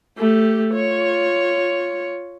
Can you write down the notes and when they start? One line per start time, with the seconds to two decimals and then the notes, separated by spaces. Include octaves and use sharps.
0.18 A3 G4
0.74 F4 C#5